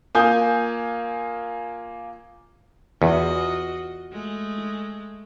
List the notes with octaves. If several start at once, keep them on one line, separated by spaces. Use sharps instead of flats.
A#3 F4 G#5 D#6 G6
E2 F4 F#4 D#5
G#3 A3